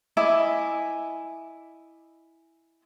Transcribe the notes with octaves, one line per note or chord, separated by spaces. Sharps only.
E4 D#5 G#5 D6